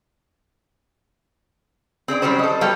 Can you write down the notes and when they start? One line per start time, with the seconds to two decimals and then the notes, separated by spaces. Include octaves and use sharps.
2.08 C4 G#4 C#5 D5
2.22 E3 F#3 G3 C#4 C5
2.39 A4 D#5
2.61 F#3 G3 B3 A4 F5